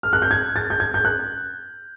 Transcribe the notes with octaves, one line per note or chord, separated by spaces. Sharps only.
F6
F#6
G6
G#6
A6
G6
G#6
G6
F#6